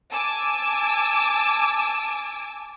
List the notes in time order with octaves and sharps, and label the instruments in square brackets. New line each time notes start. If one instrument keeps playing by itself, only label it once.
[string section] G#5 A5 D6 E6